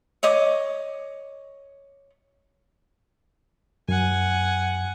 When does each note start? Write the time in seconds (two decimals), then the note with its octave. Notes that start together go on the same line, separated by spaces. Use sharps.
0.23 C#5 D#5 D6 D#6
3.89 F#2 F#5 G#5